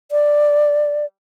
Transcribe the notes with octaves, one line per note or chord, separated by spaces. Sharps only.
D5